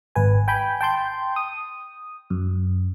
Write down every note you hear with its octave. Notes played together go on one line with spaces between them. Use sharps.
G#1 B4 G#5
G5 G#5 B5 G6
G5 A5 C6 G6
D#6
F#2